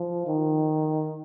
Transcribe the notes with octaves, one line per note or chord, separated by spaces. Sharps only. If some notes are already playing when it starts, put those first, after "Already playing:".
Already playing: F3
D#3